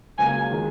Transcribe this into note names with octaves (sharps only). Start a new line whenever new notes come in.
C#2 C#3 F#3 A#3 G#5
D#3 G#3